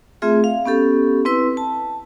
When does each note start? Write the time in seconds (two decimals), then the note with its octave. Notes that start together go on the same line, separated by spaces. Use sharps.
0.22 A3 C4 F4 G#4 E5
0.44 F5
0.66 B3 C#4 G4 A4
1.25 C4 E4 B4 E6
1.57 A5